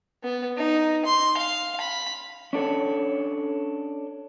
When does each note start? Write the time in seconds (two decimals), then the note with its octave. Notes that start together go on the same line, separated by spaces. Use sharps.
0.24 B3
0.57 D#4
1.06 C6
1.37 F5
1.81 B5
2.53 C#4 D4 A4 C#5